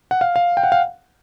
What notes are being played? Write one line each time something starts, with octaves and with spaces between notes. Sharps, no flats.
F#5
F5
F5
G5
F#5
F5